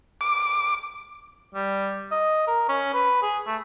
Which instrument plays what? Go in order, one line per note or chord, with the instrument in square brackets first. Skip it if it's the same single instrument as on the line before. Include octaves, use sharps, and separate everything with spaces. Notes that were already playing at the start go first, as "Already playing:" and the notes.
[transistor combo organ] D6
[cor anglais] G3
D#5
A#4
C#4
B4
G#4
A3